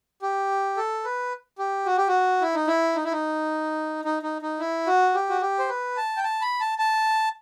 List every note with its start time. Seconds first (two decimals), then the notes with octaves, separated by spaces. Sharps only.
0.22 G4
0.77 A4
1.05 B4
1.59 G4
1.86 F#4
1.97 G4
2.08 F#4
2.41 E4
2.55 D#4
2.68 E4
2.96 D#4
3.04 E4
3.12 D#4
4.05 D#4
4.23 D#4
4.42 D#4
4.59 E4
4.87 F#4
5.15 G4
5.30 F#4
5.41 G4
5.59 C5
5.69 B4
5.97 A5
6.17 G5
6.24 A5
6.42 B5
6.61 A5
6.78 A5